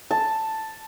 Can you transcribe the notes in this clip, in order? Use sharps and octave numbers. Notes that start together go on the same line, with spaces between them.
A5